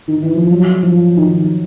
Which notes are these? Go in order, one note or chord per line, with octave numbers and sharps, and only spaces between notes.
D#3
E3
F3
F#3
F3
D#3